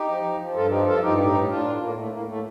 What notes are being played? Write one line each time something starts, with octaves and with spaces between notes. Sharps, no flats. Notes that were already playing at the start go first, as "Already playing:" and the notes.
Already playing: D#4 G4
F3
F3
F3
G2 F4 A4
F3 D#4 G4
G2 F4 A4
G2 D#4 G4
A2 D#4 G4
A2
A2 D4 F4
A2
A2 A#3
A2 A3
A2 A#3
A2 A3